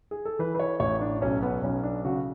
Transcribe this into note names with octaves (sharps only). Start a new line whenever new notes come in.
G#4
A4
E3 B4
B4
C#5
A1 C#5
D4
B1 C#4
B3
B1 C#4
D4
C#3 F#4